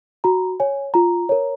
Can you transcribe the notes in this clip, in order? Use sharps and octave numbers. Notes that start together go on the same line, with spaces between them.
F#4 A#5
C#5 G#5
F4 A#5
A#4 C#5